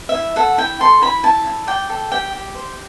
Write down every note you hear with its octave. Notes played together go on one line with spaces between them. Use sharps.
E5
E4
A4 F#5
E4 G5
A4 C6
E4 B5
E4 A5
E4
D5 G5
A4
G4 G5
G4
C5